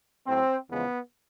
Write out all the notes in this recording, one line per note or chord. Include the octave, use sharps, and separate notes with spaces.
A2 F#3 C4
E2 C#3 F3 G#3 B3